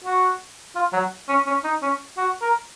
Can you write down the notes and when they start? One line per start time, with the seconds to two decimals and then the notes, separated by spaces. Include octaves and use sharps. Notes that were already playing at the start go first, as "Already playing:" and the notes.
0.04 F#4
0.76 F4
0.93 F#3
1.29 C#4
1.47 C#4
1.64 D#4
1.82 C#4
2.17 F#4
2.42 A#4